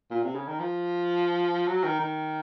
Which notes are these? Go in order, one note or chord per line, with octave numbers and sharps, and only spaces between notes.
A#2
C3
C#3
D#3
F3
F#3
D#3
D#3